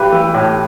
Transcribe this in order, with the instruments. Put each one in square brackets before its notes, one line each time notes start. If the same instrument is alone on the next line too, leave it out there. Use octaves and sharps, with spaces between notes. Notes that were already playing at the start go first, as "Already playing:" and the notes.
Already playing: [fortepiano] B1 G4 B4
E3
A2